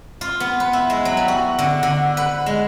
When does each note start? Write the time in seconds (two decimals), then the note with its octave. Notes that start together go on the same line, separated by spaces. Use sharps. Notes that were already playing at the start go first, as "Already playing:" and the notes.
0.21 F4
0.40 B3
0.60 B4
0.73 E4
0.90 G#3
1.05 F#3
1.17 G3
1.28 F#4
1.59 D3
1.83 D3
2.17 B4
2.46 G#3